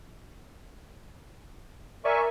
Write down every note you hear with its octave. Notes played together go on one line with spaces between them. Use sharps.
A#4 D5 E5 G#5 C#6